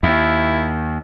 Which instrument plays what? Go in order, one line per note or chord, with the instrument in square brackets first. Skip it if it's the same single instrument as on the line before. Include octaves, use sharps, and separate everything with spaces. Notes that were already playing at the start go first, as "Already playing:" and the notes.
[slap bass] D#2 [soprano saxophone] E4